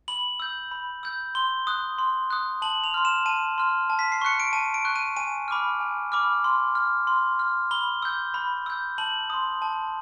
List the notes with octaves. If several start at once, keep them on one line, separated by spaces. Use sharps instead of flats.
B5 F#7
E6 G6
B5
E6 G6
C6 G7
D#6 F#6
C6
D#6 F#6
A5 F#7
F7
C6 F6
E7
A5 D#7
C6 F6
A5
B6
C7
C#6 F#6 C#7
D7
A5 D#7
D7
C#6 F#6
D#7
G#5 D#7
B5 D6 F6
G#5
B5 D6 F6
C6
F6
C6
F6
B5 G7
E6 G6
B5
E6 G6
A5 F#7
C6 D#6
A5